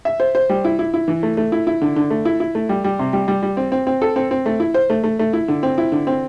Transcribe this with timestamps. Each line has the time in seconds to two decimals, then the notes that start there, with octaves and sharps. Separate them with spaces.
0.05 E5
0.20 C5
0.35 C5
0.49 G3
0.65 E4
0.79 E4
0.94 E4
1.08 E3
1.23 A3
1.37 A3
1.52 E4
1.67 E4
1.81 D3
1.96 D3
2.10 A3
2.25 E4
2.40 E4
2.55 A3
2.69 G3
2.84 G3
2.99 C3
3.13 G3
3.28 G3
3.43 G3
3.57 C4
3.72 C4
3.87 C4
4.02 A4
4.16 C4
4.31 C4
4.46 A3
4.60 E4
4.74 C5
4.90 A3
5.04 A3
5.19 A3
5.33 E4
5.48 D3
5.63 C4
5.78 E4
5.92 D3
6.07 C4